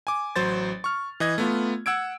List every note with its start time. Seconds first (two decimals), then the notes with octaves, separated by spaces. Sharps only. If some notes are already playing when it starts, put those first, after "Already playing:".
0.07 G#5 D6
0.36 A1 F#3 C5 A6
0.84 C#6 F6
1.20 E3 D#5 G#6
1.38 A3 B3 F4
1.86 F#5 E6 G#6 D7